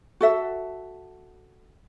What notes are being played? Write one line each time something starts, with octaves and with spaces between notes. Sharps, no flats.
F#4 A4 E5